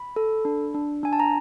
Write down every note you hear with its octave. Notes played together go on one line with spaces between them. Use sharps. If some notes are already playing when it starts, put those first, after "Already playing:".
Already playing: B5
A4
D4
D4
D4 G#5
A5
A#5